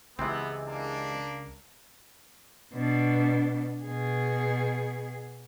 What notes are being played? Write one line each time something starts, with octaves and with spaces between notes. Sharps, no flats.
C#2 C3 E3 G#3 B3 C4
A#3 D4
B2 D4
B2 G#4